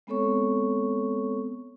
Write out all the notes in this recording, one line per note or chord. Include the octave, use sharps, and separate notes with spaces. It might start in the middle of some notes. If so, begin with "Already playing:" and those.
G#3 B3 C4 A4 C#5 C#6